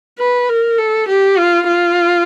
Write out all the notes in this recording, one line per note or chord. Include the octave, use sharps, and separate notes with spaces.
B4
A#4
A4
G4
F4
F4